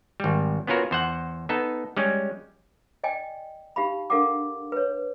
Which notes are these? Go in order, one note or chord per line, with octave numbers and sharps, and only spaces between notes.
G#1 G3
B3 C#4 F4 F#4 A#4
E2 C5 F#5
B3 D#4 A4
G3 G#3 C#4
D5 D#5 G5 G#5
D#4 G4 F5 B5
D4 A4 A#4 F5 F#5 D6
B4 C#5